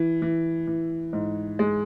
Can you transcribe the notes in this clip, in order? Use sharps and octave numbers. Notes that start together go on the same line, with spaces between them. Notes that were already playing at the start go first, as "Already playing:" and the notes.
Already playing: E3
E3
E3
G#2
G#3